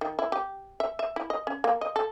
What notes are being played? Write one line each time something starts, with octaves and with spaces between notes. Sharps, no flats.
D#3
E4
G4
E5
E5
E4
D#5
C#4
A#3
D#5
A4